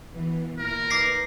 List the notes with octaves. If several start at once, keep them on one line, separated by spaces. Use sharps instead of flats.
B2 E3 B3
A#2 E4 A#4
D#4 B4 D6 A#6 C7